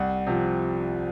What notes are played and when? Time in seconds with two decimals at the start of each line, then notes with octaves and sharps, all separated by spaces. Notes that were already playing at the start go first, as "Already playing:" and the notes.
Already playing: C2 F#5
0.27 C3 F3